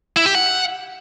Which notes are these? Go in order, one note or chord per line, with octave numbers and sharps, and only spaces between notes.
E4
G4
F#5